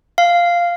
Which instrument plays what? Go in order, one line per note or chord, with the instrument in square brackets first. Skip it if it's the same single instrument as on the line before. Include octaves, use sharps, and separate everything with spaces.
[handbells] F5